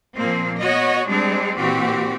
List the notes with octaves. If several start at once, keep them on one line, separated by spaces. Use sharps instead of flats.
A#2 F3 A#3 C4
B3 F#4 C#5 D#5
G3 G#3 C4 D4
A#2 E3 C4 F#4 G4